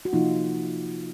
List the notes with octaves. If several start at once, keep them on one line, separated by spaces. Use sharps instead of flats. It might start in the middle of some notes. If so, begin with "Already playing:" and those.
F#4
C3 F3 A#3 D#4 F4